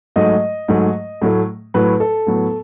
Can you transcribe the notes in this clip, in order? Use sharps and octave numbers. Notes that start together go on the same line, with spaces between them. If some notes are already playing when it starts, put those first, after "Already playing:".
G#2 F#3 A3 D#5
G#2 F#3 A3
A2 F#3 A3
A2 F#3 A3 B4
A4
A2 F#3 B3